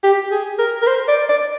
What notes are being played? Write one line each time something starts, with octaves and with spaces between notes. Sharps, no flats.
G4
G#4
A#4
A#4
C5
D5
D5